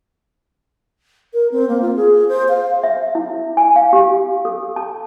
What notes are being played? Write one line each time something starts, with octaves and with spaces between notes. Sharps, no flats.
A#4
C4
A#3
F4
G#4
C5
F5
E5
E4
G#5
F5
G4
A4
A5